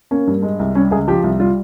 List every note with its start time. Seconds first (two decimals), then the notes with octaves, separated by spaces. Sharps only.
0.11 A#3 C#4
0.27 G2
0.43 G#3
0.59 C2
0.75 G3 C#4
0.91 C#2 G#4
1.08 F3 G4
1.24 C2
1.40 G3 F4